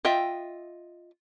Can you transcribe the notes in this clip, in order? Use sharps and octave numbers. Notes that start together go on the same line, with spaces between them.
F4 D#5 E5 G5